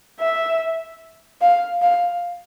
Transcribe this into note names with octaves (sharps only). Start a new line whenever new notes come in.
E5
F5
F5